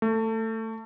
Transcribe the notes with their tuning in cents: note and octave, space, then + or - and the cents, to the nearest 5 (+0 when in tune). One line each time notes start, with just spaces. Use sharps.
A3 +20